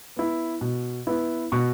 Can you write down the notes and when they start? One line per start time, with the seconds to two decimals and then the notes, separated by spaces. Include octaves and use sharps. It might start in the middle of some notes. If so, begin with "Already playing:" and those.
0.17 B3 E4
0.61 B2
1.07 B3 E4
1.52 B2 C#6